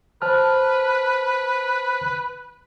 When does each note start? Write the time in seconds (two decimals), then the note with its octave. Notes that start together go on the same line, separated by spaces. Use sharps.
0.22 B4 C5 A5 F6